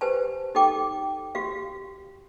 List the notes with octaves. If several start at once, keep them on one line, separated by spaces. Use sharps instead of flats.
G4 B4 C5 G#5 A5
D#4 G4 A4 G5 D6
F#4 G4 F5